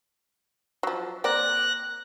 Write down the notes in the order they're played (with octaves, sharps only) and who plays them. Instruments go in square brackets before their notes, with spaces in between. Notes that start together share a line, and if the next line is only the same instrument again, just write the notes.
[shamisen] F3 F#3
[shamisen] A#3 C4 D5 [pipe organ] F#6 A#6